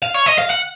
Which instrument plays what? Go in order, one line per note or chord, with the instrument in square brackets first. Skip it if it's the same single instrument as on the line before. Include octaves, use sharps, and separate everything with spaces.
[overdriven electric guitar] F5
C#5
D#5
F5
F#5